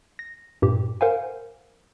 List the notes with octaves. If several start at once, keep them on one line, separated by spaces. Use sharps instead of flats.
A#6
G2 A#2 G4
A#4 C5 F5 F#5 G#5